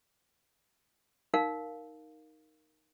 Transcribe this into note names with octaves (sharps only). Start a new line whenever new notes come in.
D#4 A#4 F5